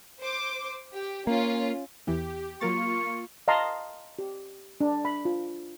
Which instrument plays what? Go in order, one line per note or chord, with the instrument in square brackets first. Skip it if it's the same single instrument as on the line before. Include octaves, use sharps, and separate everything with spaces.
[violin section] C5 D6
G4
[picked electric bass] A#3 [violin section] C#4 F4
[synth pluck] E2 E3 [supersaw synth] G4
[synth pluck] F#3 A#4 A6 [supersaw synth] A#3 F4 [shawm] C#6
[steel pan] D#5 F5 A5 A#5 C6 D#6
G4
D4
B5
F4